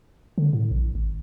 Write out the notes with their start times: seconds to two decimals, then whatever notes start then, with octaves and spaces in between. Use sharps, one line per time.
0.38 D3
0.53 A2
0.71 A#1
0.95 G#1